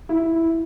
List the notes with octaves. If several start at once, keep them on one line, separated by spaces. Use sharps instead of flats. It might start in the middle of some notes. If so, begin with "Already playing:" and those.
E4